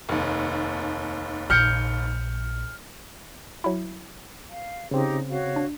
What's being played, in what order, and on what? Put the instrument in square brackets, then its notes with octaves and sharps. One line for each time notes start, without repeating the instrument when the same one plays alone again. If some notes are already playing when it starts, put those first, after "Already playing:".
[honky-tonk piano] F1 D#2
[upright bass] A#1 [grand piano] F6 G6 C#7
[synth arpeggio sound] F#3 E4
[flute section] F5
[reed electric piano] C#3 C4 [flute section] D#4 G4
[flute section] F#4 C#5 F5
[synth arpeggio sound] D4